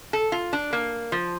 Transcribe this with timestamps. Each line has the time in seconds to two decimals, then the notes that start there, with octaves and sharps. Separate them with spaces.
0.13 A4
0.32 F4
0.53 D4
0.73 A#3
1.12 F3